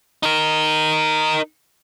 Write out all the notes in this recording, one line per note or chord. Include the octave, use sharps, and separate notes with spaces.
D#4 A#4